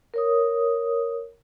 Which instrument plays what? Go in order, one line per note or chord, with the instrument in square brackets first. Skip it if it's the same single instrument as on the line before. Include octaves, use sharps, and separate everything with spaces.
[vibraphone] A#4 C#5 D#6